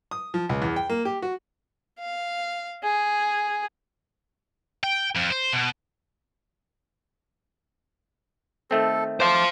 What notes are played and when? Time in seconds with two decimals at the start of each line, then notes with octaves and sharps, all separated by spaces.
0.11 D#6
0.34 F3
0.49 C#2
0.62 E2
0.76 G5
0.90 A#3
1.05 G4
1.22 F#4
1.99 F5
2.83 G#4
4.84 G5
5.15 F2
5.30 C5
5.53 B2
8.71 D#3 A3 C4 A4
9.20 C5 F5 A5 C6 D6